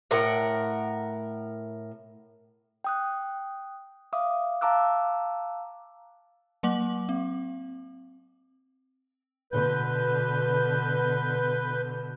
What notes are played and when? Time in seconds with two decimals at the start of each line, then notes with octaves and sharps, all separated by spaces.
0.11 A2 A#4 F#5
2.84 G5 D#6 F#6
4.13 E5 F5 D6 D#6
4.61 F5 A5 A#5 D6 E6 F#6
6.63 F#3 A#3 F#5 D6 F#7
7.09 C4
9.52 B2 D3 B4 G6